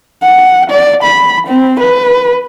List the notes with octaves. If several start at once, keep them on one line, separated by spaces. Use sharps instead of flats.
F#5
D5
B5
C4
B4